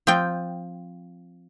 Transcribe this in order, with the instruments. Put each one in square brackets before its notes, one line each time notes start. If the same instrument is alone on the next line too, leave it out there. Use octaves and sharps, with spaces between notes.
[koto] F3 C4 F4 G5